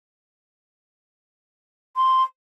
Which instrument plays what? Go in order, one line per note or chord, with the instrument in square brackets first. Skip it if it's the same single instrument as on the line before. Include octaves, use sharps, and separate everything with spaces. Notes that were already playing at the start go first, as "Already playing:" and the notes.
[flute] C6